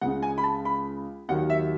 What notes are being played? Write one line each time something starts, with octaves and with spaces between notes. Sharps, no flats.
C#2 C#3 G#3 F#5
G#5
B5
A5
B5
D#2 D#3 F#3 F#5
E5